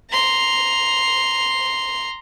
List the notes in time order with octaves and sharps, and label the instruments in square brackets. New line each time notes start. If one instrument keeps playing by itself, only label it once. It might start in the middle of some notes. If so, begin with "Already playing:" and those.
[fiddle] A#5 C6